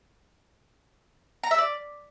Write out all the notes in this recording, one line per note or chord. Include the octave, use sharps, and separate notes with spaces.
A#5
E5
D5